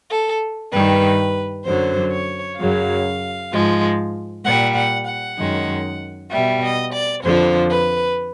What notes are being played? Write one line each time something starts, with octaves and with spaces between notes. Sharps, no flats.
A4
G2 D#3 G3 B4
F#2 D3 F#3 C5
C#5
F#2 C#3 F#3 F5
G#2 F3 G#3
A#2 G3 F#5
F#5
F#5
F#2 D#3 G#3
B2 G3 E5
D#5
D5
F2 D3 F3 C5
B4